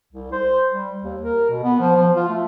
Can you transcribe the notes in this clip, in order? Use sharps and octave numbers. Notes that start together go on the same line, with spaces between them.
C2
C5
G3
D#2
A#4
B2
B3
F3
F3
F4
A3